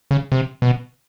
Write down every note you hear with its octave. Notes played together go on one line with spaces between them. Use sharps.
C#3
C3
B2